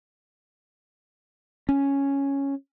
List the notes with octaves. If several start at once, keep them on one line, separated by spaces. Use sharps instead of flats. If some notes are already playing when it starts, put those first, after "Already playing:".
C#4